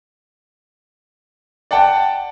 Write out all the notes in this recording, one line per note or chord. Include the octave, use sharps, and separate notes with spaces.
D5 F#5 G5 A5